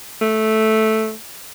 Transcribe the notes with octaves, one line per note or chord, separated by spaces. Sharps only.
A3